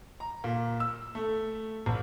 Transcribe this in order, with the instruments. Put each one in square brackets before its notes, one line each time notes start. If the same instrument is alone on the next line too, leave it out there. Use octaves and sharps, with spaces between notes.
[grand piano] A#5
A#2
E6
A3
A1